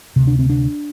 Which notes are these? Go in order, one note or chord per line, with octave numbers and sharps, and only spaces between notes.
D2 C3
D4
C4
D4